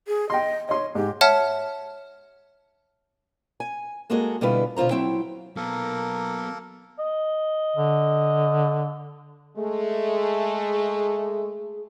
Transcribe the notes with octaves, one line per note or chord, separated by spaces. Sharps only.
G#4
D#5 G5 C6
C#5 D#5 C6
G#2 G4
C#5 E5 F#5 A5 F6
G#5
G#3 A#3 F#4 G#4 A4 D#5
B2 D3 G3 E4 F4 B4
B2 D3 F4 C5 A#5
F#3 C4 E4 G5
F#3 A#3 B3 A4 A#4
D#5
D3
G#3 A3 G#4